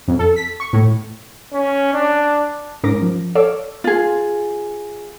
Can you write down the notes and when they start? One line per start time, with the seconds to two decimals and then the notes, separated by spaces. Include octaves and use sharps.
0.08 F2
0.19 A4
0.36 B6
0.60 C#6
0.73 A2
1.53 C#4
1.94 D4
2.84 G#2 C#4 A#4 D6 A#6
3.02 F3
3.35 A4 C#5 D5 F5 D6 E6
3.84 F4 G#4